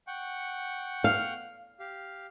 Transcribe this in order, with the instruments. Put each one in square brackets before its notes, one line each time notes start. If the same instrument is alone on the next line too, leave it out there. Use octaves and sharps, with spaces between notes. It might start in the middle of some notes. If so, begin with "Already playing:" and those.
[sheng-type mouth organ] F#5 G5 C#6
[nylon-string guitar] F5
[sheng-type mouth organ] G4 F5